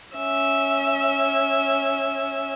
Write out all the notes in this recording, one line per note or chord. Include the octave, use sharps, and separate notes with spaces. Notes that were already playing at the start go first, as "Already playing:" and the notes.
C#4 E5